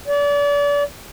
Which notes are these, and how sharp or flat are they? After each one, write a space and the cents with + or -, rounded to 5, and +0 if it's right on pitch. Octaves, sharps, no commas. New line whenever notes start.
D5 -35